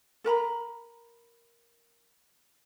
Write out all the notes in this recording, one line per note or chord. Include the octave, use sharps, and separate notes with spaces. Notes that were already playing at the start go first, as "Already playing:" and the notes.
A4 A#4 A#5 B5